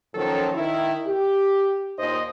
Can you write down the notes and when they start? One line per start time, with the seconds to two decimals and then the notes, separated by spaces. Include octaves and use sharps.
0.14 A#2 D#3 F3 F#3 C#4 A4
0.54 D#3 E4
1.05 G4
1.97 D#2 A#2 D#4 C5 D#5